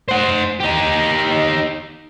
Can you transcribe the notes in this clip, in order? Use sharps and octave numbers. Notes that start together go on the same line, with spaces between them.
C5 F#5
D#4 G4